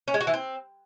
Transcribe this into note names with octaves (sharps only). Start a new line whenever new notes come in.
C#4
G#3
F#4
E3
C4